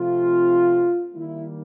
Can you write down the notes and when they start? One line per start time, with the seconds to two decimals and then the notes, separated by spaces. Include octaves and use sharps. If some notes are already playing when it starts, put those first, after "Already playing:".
Already playing: C3 F3 A3 C4 F4
1.14 D#3 G3 A#3 E4